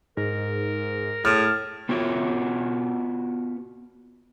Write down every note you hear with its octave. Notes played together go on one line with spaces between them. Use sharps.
G#2 A#4
A2 G#4 F6
B3 F4 F#4 C#5